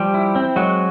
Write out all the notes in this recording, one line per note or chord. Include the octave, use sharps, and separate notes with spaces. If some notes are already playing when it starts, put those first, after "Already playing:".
Already playing: F3 G3 G4
E4
C4
F#3 G#3 F#4